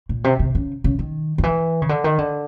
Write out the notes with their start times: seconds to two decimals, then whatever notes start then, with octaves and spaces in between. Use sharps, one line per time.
0.09 A#2
0.24 C3
0.39 C3
0.55 C#3
0.84 C#3
0.99 D#3
1.38 D#3
1.43 E3
1.82 C#3
1.89 D3
2.04 D#3
2.18 D3